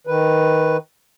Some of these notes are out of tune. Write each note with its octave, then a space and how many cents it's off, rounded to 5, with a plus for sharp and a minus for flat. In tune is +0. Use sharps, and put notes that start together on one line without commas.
D#3 +10 B4 +0